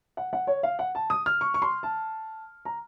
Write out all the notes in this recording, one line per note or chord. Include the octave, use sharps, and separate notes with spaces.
F#5
F#5
C#5
F5
F#5
A5
D#6
F6
C#6
C#6
C6
A5
A#5